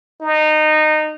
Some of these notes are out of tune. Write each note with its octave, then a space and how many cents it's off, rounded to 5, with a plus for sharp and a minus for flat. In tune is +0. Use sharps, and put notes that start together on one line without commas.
D#4 -20